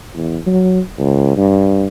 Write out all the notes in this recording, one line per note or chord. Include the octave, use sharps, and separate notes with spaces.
E2
F#3
C#2
G2